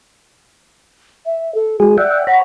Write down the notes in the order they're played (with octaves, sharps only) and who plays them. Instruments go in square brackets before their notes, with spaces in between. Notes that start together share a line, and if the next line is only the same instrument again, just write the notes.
[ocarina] E5
A4
[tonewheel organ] G#3 G#4 [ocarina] F#4
[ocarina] D5 [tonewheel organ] E5 F#5 G5
[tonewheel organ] C#5 A#5 B5 [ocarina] F#5